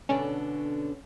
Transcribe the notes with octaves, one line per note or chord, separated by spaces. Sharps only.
B2 D3 C#4 D4